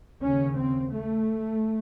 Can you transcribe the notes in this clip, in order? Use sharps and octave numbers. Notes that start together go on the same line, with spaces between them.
D#2 C#3 C#4
C4
A3